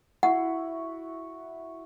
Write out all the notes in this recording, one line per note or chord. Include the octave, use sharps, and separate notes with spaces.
E4 F#4 F#5